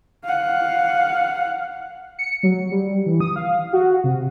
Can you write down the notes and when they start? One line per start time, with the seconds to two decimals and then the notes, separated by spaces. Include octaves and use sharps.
0.24 F5 F#5
2.19 C#7
2.43 F#3
2.71 G3
3.06 E3
3.21 D#6
3.36 F5
3.73 F#4
4.04 C3